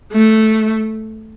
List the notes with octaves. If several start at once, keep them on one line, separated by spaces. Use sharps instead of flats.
A3